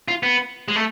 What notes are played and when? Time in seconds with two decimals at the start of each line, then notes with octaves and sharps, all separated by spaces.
0.08 F4
0.23 B3
0.68 G#3
0.76 A3